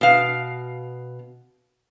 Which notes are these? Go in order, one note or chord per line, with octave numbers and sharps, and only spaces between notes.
B2 F5